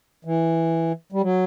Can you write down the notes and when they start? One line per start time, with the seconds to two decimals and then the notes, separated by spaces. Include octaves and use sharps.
0.25 E3
1.12 G3
1.21 F#3